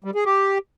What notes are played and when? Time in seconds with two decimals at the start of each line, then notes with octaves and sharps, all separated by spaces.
0.04 G3
0.15 G#4
0.26 G4